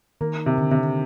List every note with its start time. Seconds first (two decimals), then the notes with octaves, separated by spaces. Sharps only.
0.21 D#3 A#3
0.46 C3
0.58 D3
0.71 C3